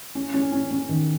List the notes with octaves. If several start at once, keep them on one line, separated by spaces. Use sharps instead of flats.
C#4
C#4
C#4
C#4
D#3